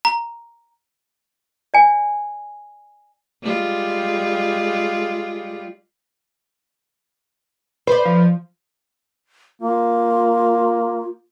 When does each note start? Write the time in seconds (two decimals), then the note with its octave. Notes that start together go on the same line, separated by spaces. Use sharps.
0.05 A#5
1.74 D5 G#5
3.43 G3 G#3 F4
7.87 B4 C5 D5
8.05 F3
9.61 A#3 F4